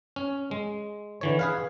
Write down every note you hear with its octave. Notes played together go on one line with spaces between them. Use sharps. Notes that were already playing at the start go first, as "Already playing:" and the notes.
C#4
G#3
D3 E3 C#5
G#4 B4 F5